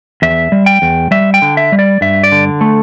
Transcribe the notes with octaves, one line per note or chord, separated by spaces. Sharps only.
E2 E5
G3
G5
E2
G3 E5
G5
D3
E5
G3
D5
G2 E5
D5
D3
A3